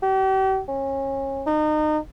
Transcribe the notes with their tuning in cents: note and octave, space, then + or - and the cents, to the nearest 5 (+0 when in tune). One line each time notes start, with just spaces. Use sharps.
G4 -40
C#4 -30
D#4 -30